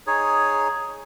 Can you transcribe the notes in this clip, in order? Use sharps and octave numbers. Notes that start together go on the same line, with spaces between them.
D#4 G#4 C#5